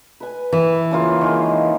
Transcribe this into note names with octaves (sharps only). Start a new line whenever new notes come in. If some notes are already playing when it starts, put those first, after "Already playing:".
B4 G#5
E3
C#3 A#3 F4
D#3 G#3